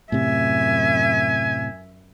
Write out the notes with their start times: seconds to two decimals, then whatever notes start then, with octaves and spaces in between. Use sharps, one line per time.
0.12 F#2 A2 C3 E5 G#5